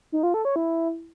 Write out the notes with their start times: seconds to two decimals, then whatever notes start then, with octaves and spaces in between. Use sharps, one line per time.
0.12 D#4
0.23 F4
0.34 A4
0.45 C#5
0.56 E4